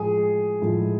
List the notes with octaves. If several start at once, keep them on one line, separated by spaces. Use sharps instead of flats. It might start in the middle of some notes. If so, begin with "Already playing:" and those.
Already playing: A2 F3 G#3 G#4
A2 F3 G#3